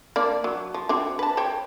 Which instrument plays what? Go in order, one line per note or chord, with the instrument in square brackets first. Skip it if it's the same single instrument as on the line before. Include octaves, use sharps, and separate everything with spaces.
[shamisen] A#3 D4 D5
F#3
F3
C4 D4 F#4
B4 A5
C5 C#5 G5